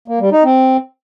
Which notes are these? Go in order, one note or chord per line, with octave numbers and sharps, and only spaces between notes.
A#3
G3
D#4
C4